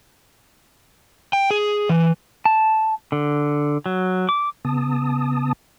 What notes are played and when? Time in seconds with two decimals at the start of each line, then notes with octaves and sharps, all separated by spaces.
1.33 G5
1.51 G#4
1.89 E3
2.45 A5
3.12 D3
3.86 F#3
4.29 D6
4.65 C#3 B3 A5 D#6